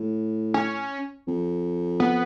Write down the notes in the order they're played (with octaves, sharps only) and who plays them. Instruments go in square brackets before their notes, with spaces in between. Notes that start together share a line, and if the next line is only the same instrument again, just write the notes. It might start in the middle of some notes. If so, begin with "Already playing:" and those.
Already playing: [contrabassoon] A2
[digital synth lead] C#4
[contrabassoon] F2
[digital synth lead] B3